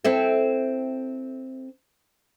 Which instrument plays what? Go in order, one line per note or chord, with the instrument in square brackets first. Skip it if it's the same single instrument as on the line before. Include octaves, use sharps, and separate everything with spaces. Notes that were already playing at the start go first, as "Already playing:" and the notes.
[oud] C4 E4 A4